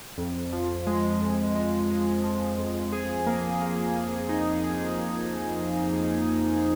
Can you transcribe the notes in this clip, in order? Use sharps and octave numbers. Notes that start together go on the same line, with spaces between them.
F2
F3
G#3
F2
G#3
G#3
F3
F2
G#4
A#3
A#3
A#3
D#4
G#4